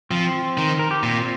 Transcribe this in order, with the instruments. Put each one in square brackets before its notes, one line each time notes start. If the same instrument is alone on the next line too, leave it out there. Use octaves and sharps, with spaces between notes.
[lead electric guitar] F3 [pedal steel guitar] C4
[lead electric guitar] D#3
[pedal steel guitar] A#4
G4
[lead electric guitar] A#2 [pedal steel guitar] C4 F4